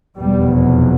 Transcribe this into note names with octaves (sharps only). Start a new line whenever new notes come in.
F1 E2 B2 G3
F#3